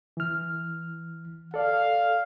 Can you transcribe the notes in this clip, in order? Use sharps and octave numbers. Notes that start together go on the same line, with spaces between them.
E3 F6
A4 D5 F5